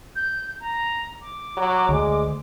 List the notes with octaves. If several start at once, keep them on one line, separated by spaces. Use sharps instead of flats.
G6
A#5
D6
F#3
D2 G#3